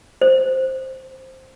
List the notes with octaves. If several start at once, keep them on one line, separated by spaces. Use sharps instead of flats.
C5